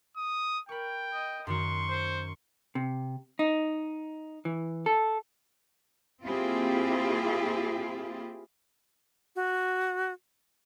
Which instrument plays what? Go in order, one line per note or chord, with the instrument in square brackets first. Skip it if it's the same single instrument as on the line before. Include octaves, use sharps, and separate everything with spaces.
[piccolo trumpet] D#6
[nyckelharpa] A#4 [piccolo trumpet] G5 [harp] B5 C#6
[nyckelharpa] D#5
[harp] F#2 D#3 F#4 [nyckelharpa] C6 C#6
[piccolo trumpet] C5
[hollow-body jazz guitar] C3
D#4
E3
A4
[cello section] A#3 C4 E4 F4 G4 G#4
[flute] F#4